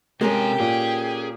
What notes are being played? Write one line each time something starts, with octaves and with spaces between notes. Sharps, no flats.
C3 G#3 C#4 G4 A4 A#4 G5 G#5
A#2 G#4